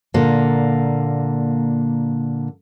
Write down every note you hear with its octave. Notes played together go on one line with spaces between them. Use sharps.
A#2 D3 A#3